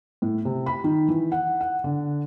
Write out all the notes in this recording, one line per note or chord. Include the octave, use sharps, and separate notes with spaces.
A2
C3
B5
D#3
E3
F#5
F#5
D3